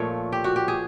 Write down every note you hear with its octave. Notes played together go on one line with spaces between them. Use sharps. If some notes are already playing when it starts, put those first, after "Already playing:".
Already playing: A#2 F3 A3 C#5
G4
F#4
G4
G#4